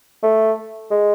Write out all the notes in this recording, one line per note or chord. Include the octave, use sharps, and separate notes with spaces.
A3
G#3